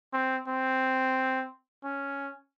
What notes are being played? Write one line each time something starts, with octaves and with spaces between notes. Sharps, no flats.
C4
C4
C#4